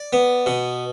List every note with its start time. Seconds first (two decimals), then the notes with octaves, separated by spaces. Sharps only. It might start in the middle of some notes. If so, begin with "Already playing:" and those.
Already playing: D5
0.13 B3
0.46 B2